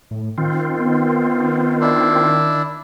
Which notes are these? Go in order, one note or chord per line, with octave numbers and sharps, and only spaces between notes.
A2
D#3 C4 F4
B3
D4 E4